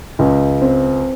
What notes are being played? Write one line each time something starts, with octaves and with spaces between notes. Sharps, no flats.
C#2
C4